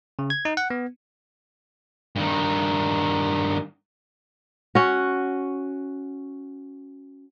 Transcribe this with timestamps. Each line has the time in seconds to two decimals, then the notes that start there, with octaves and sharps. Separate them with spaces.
0.19 C#3
0.30 G#6
0.45 D#4
0.57 F#5
0.70 B3
2.16 G2 D#3
4.75 C#4 F#4